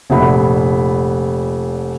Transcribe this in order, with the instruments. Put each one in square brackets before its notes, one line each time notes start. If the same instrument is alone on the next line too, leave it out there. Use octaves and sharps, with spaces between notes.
[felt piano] F1 A#2 D4 F#5 B5